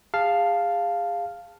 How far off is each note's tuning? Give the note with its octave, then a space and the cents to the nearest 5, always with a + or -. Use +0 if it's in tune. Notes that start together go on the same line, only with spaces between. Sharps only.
G#4 -30 F5 +0 A5 +0